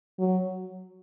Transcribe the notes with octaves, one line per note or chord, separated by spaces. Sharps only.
F#3